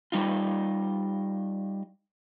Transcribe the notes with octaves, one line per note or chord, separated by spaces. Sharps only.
G3 D#4 F4